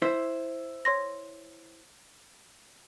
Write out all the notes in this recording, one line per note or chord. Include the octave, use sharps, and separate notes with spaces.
E4 C5 E5
C#5 C6 A#6